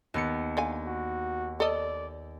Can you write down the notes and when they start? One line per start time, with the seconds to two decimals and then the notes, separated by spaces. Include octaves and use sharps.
0.14 D#2 B3 C#7
0.57 D3 F5 G#5
0.87 F#4
1.60 A4 D5 D#5